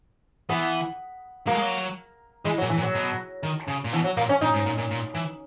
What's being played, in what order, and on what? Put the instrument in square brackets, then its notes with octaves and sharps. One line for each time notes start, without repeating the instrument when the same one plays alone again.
[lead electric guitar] E3 [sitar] B3
[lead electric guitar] F#3 [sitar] A#3
[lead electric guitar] G#3
F#3
[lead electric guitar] E3 [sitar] G#3
[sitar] F#3
[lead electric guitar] A#2
[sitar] E3
[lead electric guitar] A#2
[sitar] F#3
[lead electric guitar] B2
D#3
C#3
A#2
[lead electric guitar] B2 [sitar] E3
[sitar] F#3
[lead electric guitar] A#2 [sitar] A#3
[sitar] C#4
[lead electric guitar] A#2 [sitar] D#4
[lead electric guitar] G#2
A#2
A#2
A#2
E3